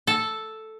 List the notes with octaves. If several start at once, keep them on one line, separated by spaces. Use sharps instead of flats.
A4